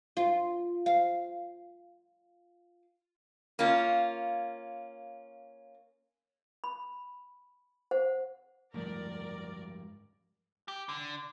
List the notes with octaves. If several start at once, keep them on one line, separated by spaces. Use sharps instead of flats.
F4
F5
A#3 C#4 F4
B5
C5 F#5
F#1 D2 G#2 F3 G3 A3 A#4 D5
G4
D3